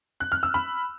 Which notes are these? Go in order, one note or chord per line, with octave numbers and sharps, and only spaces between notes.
F#6
F6
E6
B5